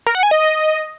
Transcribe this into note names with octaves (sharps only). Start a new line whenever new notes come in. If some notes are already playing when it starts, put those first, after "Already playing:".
A#4
F#5
G#5
D#5